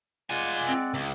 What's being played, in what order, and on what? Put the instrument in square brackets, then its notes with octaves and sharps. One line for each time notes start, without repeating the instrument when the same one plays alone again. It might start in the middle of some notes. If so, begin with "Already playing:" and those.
[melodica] G#3 D5 F#5 [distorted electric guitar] F4 G#5
[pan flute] C4
[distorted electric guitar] C#2